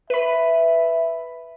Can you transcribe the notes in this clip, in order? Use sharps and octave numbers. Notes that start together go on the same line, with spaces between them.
B4 E5 B5